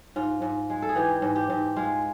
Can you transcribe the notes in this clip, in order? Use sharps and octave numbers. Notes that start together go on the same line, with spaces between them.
G#2 F4
G#2
G#3
A4
G#4
E3 G4
G#2
G4
G#2
G#3 F4